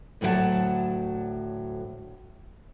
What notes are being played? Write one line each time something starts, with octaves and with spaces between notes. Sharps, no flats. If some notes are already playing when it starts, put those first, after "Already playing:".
D2 A2 F#3 A#4 F#5 A5